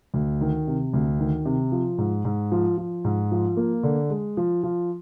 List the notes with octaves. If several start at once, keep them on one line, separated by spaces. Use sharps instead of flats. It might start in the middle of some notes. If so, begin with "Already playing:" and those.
D2
D#3
C3
D2
D#3
C3
F3
G#2
G#2
F3
F3
G#2
F3
A#3
D3
G#3
F3
F3